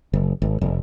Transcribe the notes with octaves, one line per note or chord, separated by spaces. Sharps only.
F#1
G#1
F1